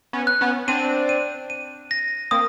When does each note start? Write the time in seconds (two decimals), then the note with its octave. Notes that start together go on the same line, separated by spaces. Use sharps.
0.13 B3 C#4
0.27 F#6
0.41 B3 C#4
0.68 C4 D4 D#7
1.09 D#7
1.50 D#7
1.91 A#6
2.31 A#3 C4 D#6